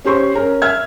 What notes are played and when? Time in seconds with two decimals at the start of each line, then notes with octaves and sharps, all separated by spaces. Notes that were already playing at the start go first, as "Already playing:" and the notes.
0.05 C#4 G4 C5 C6 C#6
0.34 C#4 A#4
0.62 E5 F6 G#6